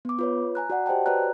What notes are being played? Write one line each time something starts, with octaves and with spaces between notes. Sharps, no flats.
B3 D6
F4 B4 C#5
G#5 A#5 F#6
F#4 D5 F#5
G4 C5 D#5 G5 A5
F#4 B4 C#5 D5 A#5 F#6